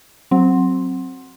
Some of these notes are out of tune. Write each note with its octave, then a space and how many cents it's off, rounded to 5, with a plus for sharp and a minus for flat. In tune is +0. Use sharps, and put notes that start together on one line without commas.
F#3 +0 C4 +10